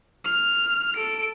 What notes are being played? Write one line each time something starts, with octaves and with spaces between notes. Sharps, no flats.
F6
A4 D7